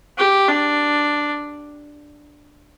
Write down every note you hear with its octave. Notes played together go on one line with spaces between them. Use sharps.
G4
D4